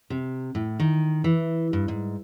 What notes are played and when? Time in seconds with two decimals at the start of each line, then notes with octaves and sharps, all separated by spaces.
0.10 C3
0.55 A2
0.80 D#3
1.24 E3
1.73 G2
1.88 G#2